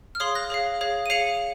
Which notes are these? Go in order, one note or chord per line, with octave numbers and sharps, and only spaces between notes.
F6
G#4 C#5 F5 C6 D#6
F#6 A#6
G#4 C#5 F5
G#4 C#5 F5
D#7
G#4 C#5 F5 C#7 F7